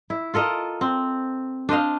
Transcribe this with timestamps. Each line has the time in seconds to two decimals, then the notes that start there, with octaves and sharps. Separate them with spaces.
0.10 E4
0.34 F4 A4 A#4 D#5
0.81 C4
1.69 D4 C5 D#5 F5